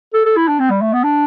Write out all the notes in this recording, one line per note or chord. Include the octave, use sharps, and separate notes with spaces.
A4
A4
E4
D4
C4
G3
A3
B3
D4